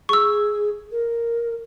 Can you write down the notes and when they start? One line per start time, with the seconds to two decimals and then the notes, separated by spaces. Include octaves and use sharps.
0.09 G#4 C#6 E6
0.91 A#4